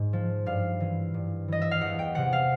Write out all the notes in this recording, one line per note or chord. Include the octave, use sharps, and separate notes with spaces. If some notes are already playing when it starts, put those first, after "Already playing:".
Already playing: G#2
F3
G2 F5
E3
G2
E3 D#5
E5
F5
E2 F#5
G5
C3 E3 F#5
F5